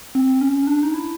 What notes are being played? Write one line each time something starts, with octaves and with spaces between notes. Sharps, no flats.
C4
C#4
C#4
D4
D#4
E4